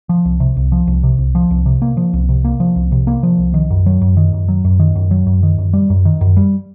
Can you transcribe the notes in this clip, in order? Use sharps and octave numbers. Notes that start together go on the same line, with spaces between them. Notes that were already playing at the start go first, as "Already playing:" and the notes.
F3
C2
C3
C2
F3
C2
C3
C2
F3
C2
C3
A#3
F3
C2
C3
A#3
F3
C2
C3
A#3
F3
C2
D#3
F#2
F#3
F#2
D#3
F#2
F#3
F#2
D#3
F#2
F#3
F#2
D#3
F#2
G3
F#2
D#3
F#2
G3